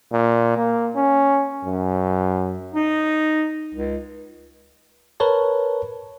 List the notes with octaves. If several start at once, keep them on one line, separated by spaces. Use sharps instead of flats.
A#2
A#3
C#4
F#2
D#4
C#2
A#4 B4 C#5 A5